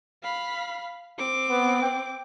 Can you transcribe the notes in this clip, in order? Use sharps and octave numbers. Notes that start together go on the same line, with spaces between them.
F5 B5
C4 D6
B3
G5